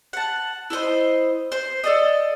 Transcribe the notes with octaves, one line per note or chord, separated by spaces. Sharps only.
F#5 A5
E4 A4 C5 D#5
C5
A4 D5 D#5